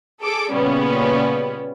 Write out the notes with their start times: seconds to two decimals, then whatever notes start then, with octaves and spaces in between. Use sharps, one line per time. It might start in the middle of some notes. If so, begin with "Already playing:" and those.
0.22 G#4 A4 D6
0.53 A#2 C#3 G3 B3 C#4